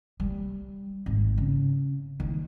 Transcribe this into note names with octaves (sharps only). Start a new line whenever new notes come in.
G3
G#1
C#3
D#3